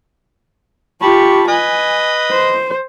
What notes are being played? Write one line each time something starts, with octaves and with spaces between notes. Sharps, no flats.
F4 G4 A5 B5 C#6
B4 D#5 G#5
C5